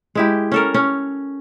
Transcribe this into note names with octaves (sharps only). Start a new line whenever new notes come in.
G#3 E4 G4
C#4 A4 A#4
C#4